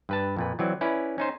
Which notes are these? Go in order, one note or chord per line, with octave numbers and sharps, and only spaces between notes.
G2 B4 A5
F2 A#2 B4
E3 F#3 C4 D5
C#4 E4 B4 D5
C#4 D#4 C5